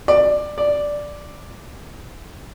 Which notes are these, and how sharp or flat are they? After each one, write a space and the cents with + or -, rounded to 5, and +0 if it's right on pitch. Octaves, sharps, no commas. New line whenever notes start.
D5 +15
D5 +0